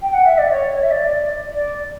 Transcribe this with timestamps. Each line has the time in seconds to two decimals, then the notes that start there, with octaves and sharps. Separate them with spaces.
0.00 G5
0.13 F#5
0.25 E5
0.38 D5
0.50 C#5
0.82 E5
0.91 D5
1.52 D5